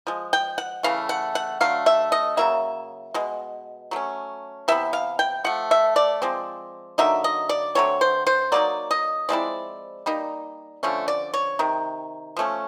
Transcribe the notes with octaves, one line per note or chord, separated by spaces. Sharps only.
F3 G#3
G5
F#5
C#3 E3 A3 F5
F#5
F#5
D3 F#3 A3 F5
E5
D#5
C#3 F#3 A#3 E5
B2 G#3
F#3 A3 C#4
C3 E3 B3 E5
F5
G5
F3 A3 F#5
E5
D5
F3 G#3 C4
D3 F#3 A#3 D#4 E5
D#5
D5
D3 F#3 A3 C4 C#5
C5
C5
F#3 A#3 D#4 D5
D#5
F3 G#3 C4 E4 D5
G3 A#3 D#4
D3 F3 A3 C#4
D5
C#5
C3 D#3
F3 A3 C#4